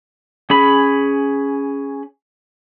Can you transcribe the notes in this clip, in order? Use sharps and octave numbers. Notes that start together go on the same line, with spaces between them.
C#4 G#4 B5